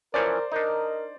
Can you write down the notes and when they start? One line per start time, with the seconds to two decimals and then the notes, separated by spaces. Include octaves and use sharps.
0.14 E3 F3 C#4 A#4 C5 D5
0.52 D4 D#4 A#4 D#5